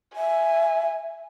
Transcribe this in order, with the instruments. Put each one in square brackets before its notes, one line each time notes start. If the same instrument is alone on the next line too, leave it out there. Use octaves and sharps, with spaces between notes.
[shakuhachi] E5 [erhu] G#5